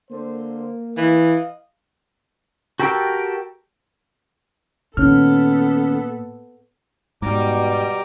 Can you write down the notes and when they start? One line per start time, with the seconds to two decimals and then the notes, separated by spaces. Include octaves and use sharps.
0.11 D3 A#3 C5
0.97 E3 D#5 F5
2.80 F#4 G4 A4 A#4 F5 G5
4.97 A#2 D#3 B3 C#4 A4 F6
7.22 G#2 B2 G3 A#5 D6